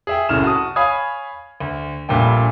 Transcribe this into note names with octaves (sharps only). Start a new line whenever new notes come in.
G#4 E5 G5
C2 F#2 A2 F6 E7
F#4 A5 D#6
C#5 F5 G#5 B5 D#6 G#6
D2
A#1 G2 A#2 G3 A3 G5